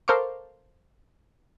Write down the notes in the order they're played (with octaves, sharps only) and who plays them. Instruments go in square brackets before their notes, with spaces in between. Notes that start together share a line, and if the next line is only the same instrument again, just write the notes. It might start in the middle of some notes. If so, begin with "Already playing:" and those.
[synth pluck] A4 A#4 C5 F5 C#6 D6